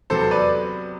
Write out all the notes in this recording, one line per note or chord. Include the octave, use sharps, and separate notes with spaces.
C3 F#3 B3 A4 C5
B4 D5